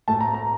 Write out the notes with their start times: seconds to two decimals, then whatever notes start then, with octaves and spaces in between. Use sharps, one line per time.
0.08 A2 A3 A5
0.21 A#5
0.34 A#5